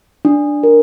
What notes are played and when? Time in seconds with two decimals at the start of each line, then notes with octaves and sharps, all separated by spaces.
0.25 D4
0.63 A#4